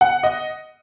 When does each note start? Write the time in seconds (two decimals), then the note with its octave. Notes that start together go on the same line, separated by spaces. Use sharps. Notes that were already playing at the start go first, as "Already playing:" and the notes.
0.01 F#5
0.23 D#5